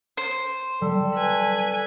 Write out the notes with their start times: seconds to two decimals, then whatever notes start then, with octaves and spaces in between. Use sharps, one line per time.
0.17 C5
0.81 G3 A4
1.14 B4 G#5